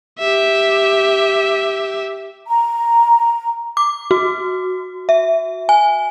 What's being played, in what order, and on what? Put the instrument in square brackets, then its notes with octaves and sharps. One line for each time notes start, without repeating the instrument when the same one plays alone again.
[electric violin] G4 E5
[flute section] A#5
[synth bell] D6
F#4
E5
G#5